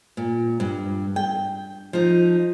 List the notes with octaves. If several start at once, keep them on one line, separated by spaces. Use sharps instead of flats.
A#2
G2
G5
F3 D#4